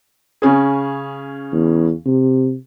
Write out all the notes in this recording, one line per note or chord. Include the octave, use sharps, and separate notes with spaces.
C#3 C#4 G#4
E2
C3